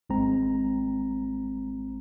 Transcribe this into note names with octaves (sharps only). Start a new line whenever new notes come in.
G#1 G#3 C4 A#5